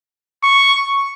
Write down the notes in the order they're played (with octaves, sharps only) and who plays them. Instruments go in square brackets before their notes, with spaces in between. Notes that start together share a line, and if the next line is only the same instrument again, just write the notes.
[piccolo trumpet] C#6